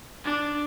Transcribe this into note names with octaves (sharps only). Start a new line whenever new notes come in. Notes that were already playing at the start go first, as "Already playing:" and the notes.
D4